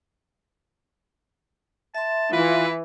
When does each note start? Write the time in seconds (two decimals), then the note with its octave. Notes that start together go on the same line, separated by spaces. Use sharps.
1.95 E5 A5 C6
2.33 E3 F4 B4